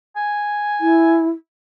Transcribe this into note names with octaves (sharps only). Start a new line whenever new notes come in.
G#5
E4